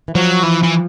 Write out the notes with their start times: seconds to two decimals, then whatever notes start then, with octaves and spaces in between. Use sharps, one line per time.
0.08 E3
0.15 F3 F#3
0.43 E3
0.63 E3